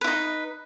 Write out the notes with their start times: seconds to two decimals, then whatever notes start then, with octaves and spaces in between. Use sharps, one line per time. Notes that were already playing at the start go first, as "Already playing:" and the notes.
0.01 B4
0.04 E4
0.07 D#4